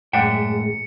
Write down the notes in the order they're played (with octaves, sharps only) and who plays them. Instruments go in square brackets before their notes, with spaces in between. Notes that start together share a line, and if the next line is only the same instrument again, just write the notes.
[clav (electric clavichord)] F#2 D4 E5 [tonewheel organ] A2 G#3 [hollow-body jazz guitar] F#5 G5 [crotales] C#7